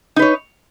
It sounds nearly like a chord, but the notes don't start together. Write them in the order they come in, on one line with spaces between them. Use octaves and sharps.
D#4 B4 C#5